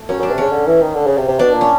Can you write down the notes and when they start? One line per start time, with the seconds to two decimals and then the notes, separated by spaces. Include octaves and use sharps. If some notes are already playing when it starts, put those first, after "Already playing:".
Already playing: A3
0.09 F#2 C#4
0.19 F#2 D4
0.31 C3
0.38 C#3 C#4
0.52 D3
0.67 E3
0.81 D#3
0.95 D3
1.07 C#3
1.18 C3
1.28 C3
1.39 B2 D4
1.54 A#2
1.61 C#4